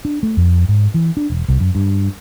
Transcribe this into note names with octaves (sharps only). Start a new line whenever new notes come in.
D4
A3
F2
G#2
E3
D4
E1
C2
F#2
G2